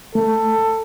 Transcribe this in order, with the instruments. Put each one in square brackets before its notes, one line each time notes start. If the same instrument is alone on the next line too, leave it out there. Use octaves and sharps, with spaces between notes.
[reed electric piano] A3 [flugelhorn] A4